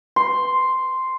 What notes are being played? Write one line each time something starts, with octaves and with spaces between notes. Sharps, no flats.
C6